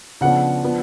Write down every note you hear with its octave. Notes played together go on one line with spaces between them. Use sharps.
C#3 F3 B3 D4 F#5
F3 B3 D4